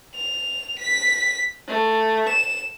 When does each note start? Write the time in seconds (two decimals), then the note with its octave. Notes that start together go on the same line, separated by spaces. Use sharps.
0.15 F7
0.79 B6
1.68 A3
2.29 E7